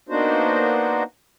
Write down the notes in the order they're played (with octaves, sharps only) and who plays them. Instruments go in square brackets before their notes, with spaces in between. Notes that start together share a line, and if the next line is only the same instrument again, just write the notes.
[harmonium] A#3 B3 D4 D#4 F#4 C5